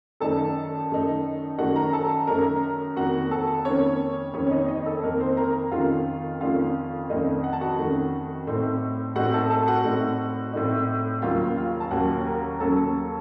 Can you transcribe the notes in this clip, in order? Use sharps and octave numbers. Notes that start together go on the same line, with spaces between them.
F#2 D#3 A3 D#4 A4 A5
F#2 D#3 A3 D#4
F#2 D#3 A3 D#4 F#4 F#5
A#4 A#5
A4 A5
F#2 D#3 A3 D#4 A#4 A#5
F2 D#3 A#3 F#4 F#5
A4 A5
F2 D#3 A#3 C#4 C#5
F2 D#3 A#3 C#4 C#5
C#5
D#4 D#5
D#4 D#5
A4
F2 D#3 A#3 A#4
C4 C5
A#4 A#5
F2 D#3 A3 C#4 F4 F5
F2 D#3 A3 C#4 F4 F5
F2 D#3 A3 C#4 D#4 D#5
F#5
A5
F#4 F#5
F2 D#3 A3 C#4
A2 A3 C4 D#4
A2 A3 C4 D#4 F#4 F#5
A4 A5
A4 A5
F#4 F#5
A2 A3 C4 D#4
A2 A3 C4 D#4
D#2 C#3 F#3 A#3 C#4 F4 F5
F4 F5
A5
D#2 C#3 F#3 A#3 C#4 F#4 F#5
A#4 A#5
D#2 C#3 F#3 A#3 C#4 A4 A5